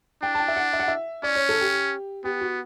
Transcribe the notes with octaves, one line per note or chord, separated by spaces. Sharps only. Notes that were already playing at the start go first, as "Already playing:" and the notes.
D4 G5
A5
G5
E5
F#5
E5
F#5
E5
C#4 D5
C#5
A4
G4
B3 G4
F#4